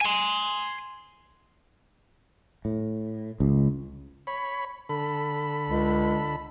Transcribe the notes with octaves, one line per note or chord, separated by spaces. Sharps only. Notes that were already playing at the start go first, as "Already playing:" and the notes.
G#5 C6
A2
C#2
C#5 B5
D3 A4 B5
C#2